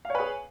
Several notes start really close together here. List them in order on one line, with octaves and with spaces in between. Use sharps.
F5 C#5 B4 G#4